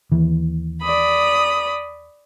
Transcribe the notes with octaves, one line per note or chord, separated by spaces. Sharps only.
D#2 E3
D5 B5 D#6